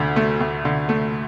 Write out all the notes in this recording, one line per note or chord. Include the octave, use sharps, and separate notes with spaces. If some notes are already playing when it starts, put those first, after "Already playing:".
Already playing: D2 D3
A3
D2
D3
A3